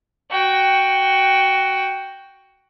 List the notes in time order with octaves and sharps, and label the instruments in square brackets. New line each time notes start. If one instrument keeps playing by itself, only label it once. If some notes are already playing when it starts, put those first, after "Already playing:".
[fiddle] F#4 G5